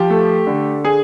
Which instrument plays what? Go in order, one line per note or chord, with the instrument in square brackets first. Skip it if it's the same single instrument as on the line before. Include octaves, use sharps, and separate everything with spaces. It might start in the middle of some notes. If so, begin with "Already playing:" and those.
Already playing: [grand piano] F3 G4
A3
D3
G#4